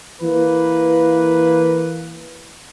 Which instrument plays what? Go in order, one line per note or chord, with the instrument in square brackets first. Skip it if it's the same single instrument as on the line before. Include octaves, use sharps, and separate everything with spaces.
[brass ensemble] E3 A#3 B4